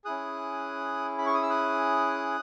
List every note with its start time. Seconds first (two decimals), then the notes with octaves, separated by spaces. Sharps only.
0.05 C#4 E4 G#4 D#6 F#6
1.18 B5
1.26 C#6
1.34 D#6
1.42 E6
1.50 D#6 F#6